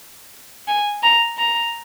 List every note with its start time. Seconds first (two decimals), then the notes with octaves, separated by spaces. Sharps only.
0.68 G#5
1.03 A#5
1.38 A#5